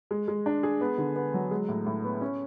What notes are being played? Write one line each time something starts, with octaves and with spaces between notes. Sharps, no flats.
G#3
G#3
D4
G#4
B3
D3
B3
F#3
G#3
A2
A2
B3
C#4